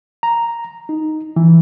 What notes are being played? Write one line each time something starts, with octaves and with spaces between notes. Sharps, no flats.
A#5
D#4
E3